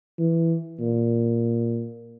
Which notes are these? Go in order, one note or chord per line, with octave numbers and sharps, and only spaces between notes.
E3
A#2